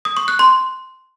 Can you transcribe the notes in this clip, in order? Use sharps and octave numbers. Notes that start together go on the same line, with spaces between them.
D#6
C#6
F#6
C6